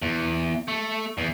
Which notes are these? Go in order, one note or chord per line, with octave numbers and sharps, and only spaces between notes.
E2
A3
E2